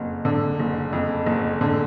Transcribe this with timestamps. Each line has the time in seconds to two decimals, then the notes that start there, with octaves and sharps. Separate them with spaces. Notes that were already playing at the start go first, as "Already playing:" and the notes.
Already playing: F#1 F2
0.25 D3
0.60 F#1
0.93 F2
1.26 F#1
1.61 D3